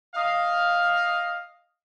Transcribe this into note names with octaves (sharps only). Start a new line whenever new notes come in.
D#5 F5